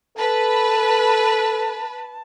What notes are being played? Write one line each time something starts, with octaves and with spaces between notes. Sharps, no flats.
A4 B4 A5